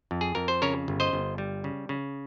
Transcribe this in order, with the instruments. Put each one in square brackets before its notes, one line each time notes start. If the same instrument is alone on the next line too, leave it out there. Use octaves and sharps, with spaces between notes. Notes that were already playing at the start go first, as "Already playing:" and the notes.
[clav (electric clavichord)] F2
G#4
F2 A#4
C5
C#3 A#4 C#5
G1
C5 D#5
G1
G3
C#3
C#3